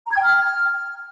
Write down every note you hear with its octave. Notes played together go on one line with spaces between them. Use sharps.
A#5
G#6
G5
F6